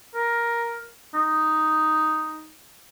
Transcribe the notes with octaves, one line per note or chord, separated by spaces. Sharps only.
A#4
D#4